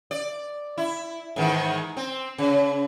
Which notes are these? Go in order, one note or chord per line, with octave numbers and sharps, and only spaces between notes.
D5
E4
G#2 D#3 E3
C4
C#3